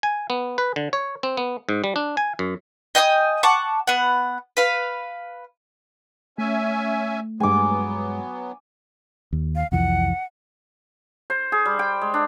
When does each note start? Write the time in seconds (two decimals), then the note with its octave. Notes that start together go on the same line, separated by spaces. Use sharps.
0.03 G#5
0.30 B3
0.58 B4
0.76 D3
0.93 C#5
1.23 C4
1.37 B3
1.69 G#2
1.84 G3
1.96 D4
2.17 G#5
2.39 F#2
2.95 D#5 G5 G#5 D#6
3.43 F#5 A5 C#6 D6
3.87 B3 F#5
4.57 B4 F5
6.38 A3 C#4 E5 G#5
7.40 G2 F#3 G#3 B3 G#5 D6
9.33 D#2
9.56 F5
9.72 C2 F2 E3 F#5
11.30 C5
11.52 G#4
11.65 G3
11.79 G5
12.01 G#3
12.14 D4